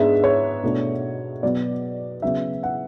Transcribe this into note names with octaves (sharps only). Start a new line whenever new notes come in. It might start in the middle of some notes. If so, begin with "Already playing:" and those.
Already playing: G#2 G#3 B3 D4 E5
C#5
B2 A3 D4
B2 F#3 B3 D5
C#3 F#3 B3 E5
F#5